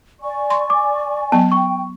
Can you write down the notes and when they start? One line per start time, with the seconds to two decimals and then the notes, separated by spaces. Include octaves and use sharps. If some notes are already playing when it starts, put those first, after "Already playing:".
0.21 D5 G#5 C#6
0.50 C6
0.70 D6
1.32 F#3 B3 A5
1.52 G5 C#6